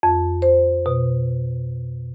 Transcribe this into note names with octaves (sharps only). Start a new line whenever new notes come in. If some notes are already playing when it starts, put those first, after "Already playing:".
F2
C5
B2